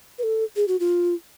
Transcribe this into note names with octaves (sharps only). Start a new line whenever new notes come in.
B4
A4
G#4
F#4
F4